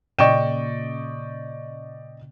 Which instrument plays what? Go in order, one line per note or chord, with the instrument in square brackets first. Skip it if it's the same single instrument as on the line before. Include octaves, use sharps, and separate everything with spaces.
[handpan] A#2 C#3 [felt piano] D5 D#5 E7 [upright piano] G5 C#6